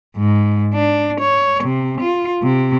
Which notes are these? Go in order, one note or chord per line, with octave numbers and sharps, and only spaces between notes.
G#2
D4
C#5
C3
F4
C3